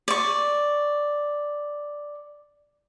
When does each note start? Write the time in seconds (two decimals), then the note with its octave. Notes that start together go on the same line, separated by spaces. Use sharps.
0.08 D5 C#6